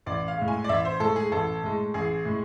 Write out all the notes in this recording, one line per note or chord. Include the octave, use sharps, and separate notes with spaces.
A1 D5
F5
A2 G#3
G#5
D5
A1 E5
C5
A2 G#3 A4
G#4
A1 A4
A2 G#3
A1 G#4
A2 G#3